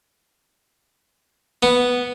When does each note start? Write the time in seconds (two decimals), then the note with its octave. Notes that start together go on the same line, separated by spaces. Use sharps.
1.63 B3